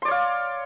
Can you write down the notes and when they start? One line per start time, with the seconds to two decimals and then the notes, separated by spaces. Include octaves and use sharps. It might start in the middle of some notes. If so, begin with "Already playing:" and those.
0.02 C6
0.05 D5
0.08 C#5
0.11 F5